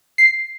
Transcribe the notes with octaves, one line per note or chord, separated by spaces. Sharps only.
C7